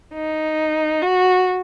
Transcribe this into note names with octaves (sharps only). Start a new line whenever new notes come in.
D#4
F#4